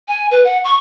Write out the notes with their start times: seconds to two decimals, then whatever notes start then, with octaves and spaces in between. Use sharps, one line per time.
0.08 G#5
0.31 B4
0.45 F#5
0.64 C#6